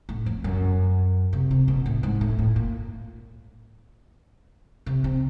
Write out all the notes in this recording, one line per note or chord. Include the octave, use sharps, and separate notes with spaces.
A2
F2
F#2
C3
C3
B2
A2
G#2
A2
A2
A#2
C3
C3